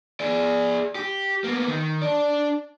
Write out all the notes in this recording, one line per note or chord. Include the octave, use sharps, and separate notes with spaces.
G#4 D5
G4
A#3 B3
D#3
D4 D5